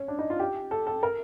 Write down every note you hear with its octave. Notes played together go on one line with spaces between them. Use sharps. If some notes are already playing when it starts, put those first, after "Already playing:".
Already playing: C#4
D4
D#4
F4
G4
A4
A4
A#4